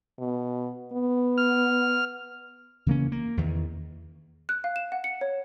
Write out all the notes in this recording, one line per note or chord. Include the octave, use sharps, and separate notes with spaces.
B2
B3
F6
C#3 E3 A#3 C#4
A#3
E2 D#3
F#6
F5
E7
F#5
C#7
C#5